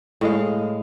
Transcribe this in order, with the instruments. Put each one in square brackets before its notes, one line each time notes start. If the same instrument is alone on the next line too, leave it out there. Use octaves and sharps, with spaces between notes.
[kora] A2 G#3 F5